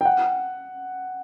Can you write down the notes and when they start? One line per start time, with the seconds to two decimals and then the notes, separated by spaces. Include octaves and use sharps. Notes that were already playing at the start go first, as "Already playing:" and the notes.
0.01 G5
0.05 F#5